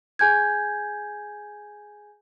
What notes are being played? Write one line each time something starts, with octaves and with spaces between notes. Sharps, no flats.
G#4 G#5 G6 G#6